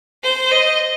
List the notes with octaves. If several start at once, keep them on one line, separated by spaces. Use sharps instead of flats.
C5
D#5